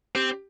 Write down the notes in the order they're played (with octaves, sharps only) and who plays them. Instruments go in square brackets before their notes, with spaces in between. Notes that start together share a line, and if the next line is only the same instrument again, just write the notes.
[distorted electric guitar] C4 [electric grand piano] G4